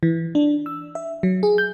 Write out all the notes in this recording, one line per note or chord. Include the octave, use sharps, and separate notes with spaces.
E3
D4
E6
E5
F#3
G#4
G6